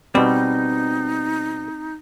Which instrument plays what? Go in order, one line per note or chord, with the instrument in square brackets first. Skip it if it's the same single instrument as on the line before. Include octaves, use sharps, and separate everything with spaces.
[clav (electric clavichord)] B2 G3 [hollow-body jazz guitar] C4 [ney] D#4